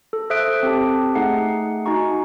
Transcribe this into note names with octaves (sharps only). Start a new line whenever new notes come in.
A4
A4 C5 E5 D#6 F#6 D7
C4 G4 A5
A3 D#4 G#4 F#5 C7
D#4 F#4 G#5 A#5 C#6